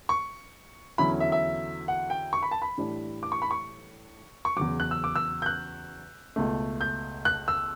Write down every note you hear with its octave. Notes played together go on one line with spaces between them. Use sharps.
C#6
E2 D3 F#3 C#4 E4 B5
E5
E5
F#5
G5
C#6
B5
A5
B5
A2 E3 G3 D4
D6
C#6
B5
C#6
C#6
E2 C#3 F#3 D6
F#6
E6
D6
E6
G6
F#6
C#2 B2 A3
G6
F#6
E6